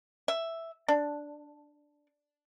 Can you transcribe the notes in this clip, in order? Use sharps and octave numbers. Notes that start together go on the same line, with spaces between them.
E5
D4